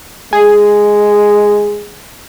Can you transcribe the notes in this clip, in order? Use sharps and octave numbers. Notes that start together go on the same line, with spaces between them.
G#3 G#4